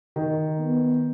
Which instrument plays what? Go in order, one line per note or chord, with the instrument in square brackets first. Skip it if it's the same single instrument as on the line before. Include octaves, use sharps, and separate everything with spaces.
[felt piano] D#3
[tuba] B3